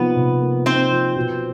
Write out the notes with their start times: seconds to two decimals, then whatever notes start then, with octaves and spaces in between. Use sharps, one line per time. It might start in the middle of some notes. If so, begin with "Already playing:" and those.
Already playing: C3 F3 A#3 B3 D#4 B4
0.16 C3
0.41 A#3
0.66 C4 D#4 C5
0.91 F3
1.16 B2